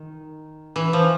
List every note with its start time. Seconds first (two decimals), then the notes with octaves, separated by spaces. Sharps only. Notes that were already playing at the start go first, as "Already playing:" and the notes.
Already playing: D#3
0.76 E3
0.93 F3